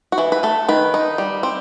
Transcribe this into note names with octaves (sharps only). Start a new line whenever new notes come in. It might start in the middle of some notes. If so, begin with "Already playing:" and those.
F#4
E3 E4
B4
A3 A4
D#3 B4
D#4
G3
C4